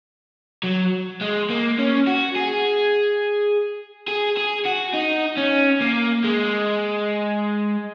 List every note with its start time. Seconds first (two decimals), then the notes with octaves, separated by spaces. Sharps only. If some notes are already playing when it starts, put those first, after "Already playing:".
0.63 F#3
1.21 G#3
1.50 A#3
1.79 C#4
2.07 F#4
2.36 G#4
4.08 G#4
4.37 G#4
4.66 F#4
4.94 D#4
5.37 C#4
5.81 A#3
6.24 G#3